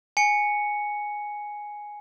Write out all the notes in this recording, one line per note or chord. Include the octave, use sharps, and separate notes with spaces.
G#5 C#7